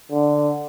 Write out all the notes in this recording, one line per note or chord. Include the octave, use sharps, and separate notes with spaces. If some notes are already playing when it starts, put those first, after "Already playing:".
D3